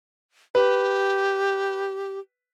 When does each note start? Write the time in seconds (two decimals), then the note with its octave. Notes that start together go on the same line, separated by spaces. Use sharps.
0.55 G4 B4